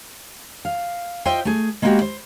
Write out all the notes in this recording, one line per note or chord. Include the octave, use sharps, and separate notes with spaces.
F5
F4 C5 D#5 E5 G5
A3 G#4
G#3 A#3 B3 C#4 F#4 G4
C5